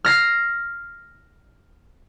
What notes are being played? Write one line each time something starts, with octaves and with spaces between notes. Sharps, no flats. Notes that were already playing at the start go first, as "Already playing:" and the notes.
F6 A#6 C7